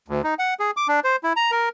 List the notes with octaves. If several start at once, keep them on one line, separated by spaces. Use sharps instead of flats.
D2
D#4
F#5
G#4
D6
D4
C5
E4
A#5
A#4